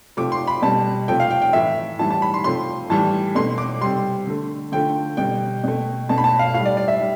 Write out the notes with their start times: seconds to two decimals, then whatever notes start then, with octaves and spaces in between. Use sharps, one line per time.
0.17 C3 F3 A3 D6
0.32 C6
0.47 B5
0.62 B2 G3 A5
1.08 C3 F3 A3 G5
1.20 F5
1.31 G5
1.42 G5
1.53 A2 E3 A3 E5
1.99 A2 E3 G3 A5
2.11 A5
2.22 B5
2.34 C6
2.44 C3 F3 A3 C6
2.90 A2 E3 G3 A5
3.35 B2 A3 C6
3.58 D6
3.81 C3 G3 C6
4.27 D3 A3
4.72 D3 F3 A3 G5
5.17 B2 G3 G5
5.64 B2 A3
6.09 B2 A3 A5
6.18 B5
6.24 A5
6.39 F5
6.54 A2 F5
6.59 G3
6.66 D5
6.77 D5
6.88 E5
7.00 G3